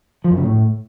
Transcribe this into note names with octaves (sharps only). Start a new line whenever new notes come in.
F3
F#2
C#3
A2